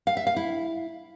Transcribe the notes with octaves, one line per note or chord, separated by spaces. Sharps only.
F5
E5
F5
E4